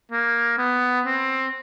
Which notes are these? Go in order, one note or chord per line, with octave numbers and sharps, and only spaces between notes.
A#3
B3
C4